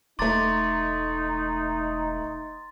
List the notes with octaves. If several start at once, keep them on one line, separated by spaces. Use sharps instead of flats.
E1 A3 D#4 A#5 C6 D6 A6